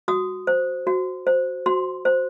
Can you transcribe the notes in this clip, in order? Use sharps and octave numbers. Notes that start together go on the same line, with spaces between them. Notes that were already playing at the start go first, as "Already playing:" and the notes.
F#4 D#6
C5
F#4
C5
F#4 C6
C5